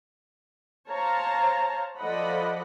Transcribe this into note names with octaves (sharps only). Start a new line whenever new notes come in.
C5 C#5 F5 A5 A#5
F3 A4 D5 D#5 F#5 B5